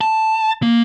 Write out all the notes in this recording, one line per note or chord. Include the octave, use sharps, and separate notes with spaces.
A5
A#3